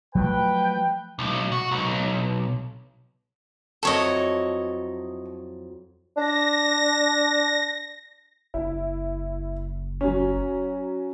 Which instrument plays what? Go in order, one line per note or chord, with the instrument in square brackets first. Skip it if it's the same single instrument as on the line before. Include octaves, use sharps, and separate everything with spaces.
[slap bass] F3 F#3 A3 [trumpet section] B4 G5
[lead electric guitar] B1
F#4
B1
[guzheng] F2 F#3 E4 [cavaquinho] A4 C#5 D#5
[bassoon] D4 [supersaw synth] A#6
[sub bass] F#1 [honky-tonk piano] E4
[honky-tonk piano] F#3 C#4